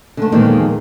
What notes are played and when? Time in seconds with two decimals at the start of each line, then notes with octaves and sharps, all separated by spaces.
0.17 D3 A3
0.32 E2 A#2 D#3 F3 G#3